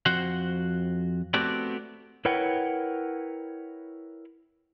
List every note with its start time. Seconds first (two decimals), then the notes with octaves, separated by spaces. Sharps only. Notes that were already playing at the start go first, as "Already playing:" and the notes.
0.06 F2 F#4 C5 F#5
1.34 A3 B3 C4 F#4 G4 D5
2.25 E4 A#4 B4 C#5 F#5 G5